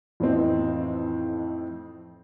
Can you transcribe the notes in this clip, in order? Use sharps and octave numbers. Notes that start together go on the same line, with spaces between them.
F2 A2 E3 C4 D#4